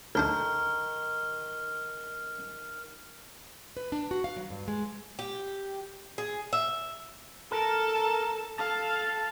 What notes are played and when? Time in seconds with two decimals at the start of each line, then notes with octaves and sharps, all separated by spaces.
0.15 D2 D#3 D4 C5 F6
3.77 B4
3.92 D4
4.11 F#4
4.24 F5
4.36 F#3
4.50 G2
4.68 G#3
5.19 G4
6.18 G#4
6.53 E5
7.52 A4 A#4 A5
8.58 A4 F5 A5